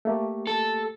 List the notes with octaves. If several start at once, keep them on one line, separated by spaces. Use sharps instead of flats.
A3 A#3 G4
A4